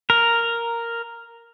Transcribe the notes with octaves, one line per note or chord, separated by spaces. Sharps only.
A#4